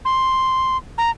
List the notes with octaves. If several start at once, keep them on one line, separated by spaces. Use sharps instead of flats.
C6
A#5